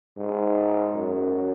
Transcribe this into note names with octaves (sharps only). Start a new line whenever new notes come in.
G#2
F#2